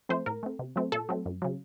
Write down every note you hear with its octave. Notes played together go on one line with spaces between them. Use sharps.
F3 A3 C4 C5
A2 A#4
A3 C4
C3
F#3 A3 C4
A#2 A4
F#3 A3 C4
F#2
C#3 F#3